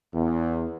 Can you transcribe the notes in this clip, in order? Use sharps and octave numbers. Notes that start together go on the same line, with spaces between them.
E2